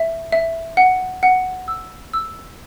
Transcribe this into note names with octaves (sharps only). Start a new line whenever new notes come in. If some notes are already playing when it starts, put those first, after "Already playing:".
Already playing: E5
E5
F#5
F#5
E6
E6